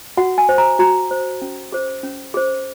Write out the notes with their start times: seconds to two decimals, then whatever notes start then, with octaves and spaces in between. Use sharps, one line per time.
0.17 F#4 F#5
0.38 G#5
0.49 C5
0.58 A#5
0.79 F#4 A#5
1.11 C5
1.42 C#4
1.72 G#4 C5
2.03 C#4
2.34 G#4 C5